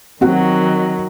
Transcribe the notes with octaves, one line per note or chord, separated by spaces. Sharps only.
D#3 F#3 C4 F#4